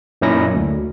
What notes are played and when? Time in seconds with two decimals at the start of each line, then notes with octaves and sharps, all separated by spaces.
0.22 F#2 A#2 C#4 D#4 E4 A#6
0.55 D2